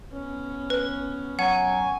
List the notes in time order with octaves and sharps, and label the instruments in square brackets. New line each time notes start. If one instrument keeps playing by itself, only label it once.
[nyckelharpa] B3 C#4
[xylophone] B4
[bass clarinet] F#3 [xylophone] F#5 [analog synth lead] G#5